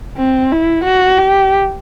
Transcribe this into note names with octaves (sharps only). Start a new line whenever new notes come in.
C4
E4
F#4
G4